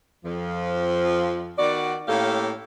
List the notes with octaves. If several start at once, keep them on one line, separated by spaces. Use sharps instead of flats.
F2 F3
D#3 B3 F#4 D5
A2 A#3 C#4 G4 A4 F5